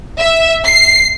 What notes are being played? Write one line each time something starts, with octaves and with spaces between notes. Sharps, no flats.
E5
C7